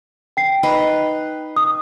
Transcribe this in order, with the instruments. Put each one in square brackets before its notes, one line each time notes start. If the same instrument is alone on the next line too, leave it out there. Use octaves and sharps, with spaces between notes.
[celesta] G5 C7
[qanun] D#4 B4
[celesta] D#6